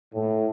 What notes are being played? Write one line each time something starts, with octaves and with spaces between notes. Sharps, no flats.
A2